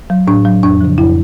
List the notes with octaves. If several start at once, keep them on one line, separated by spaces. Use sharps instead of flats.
F#3
A2 D4
F#3
F2 D4
C#3 F3
F2 E4